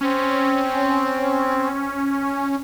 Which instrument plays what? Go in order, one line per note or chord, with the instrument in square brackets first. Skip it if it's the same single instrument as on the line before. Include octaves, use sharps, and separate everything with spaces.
[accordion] C4 [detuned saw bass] C#4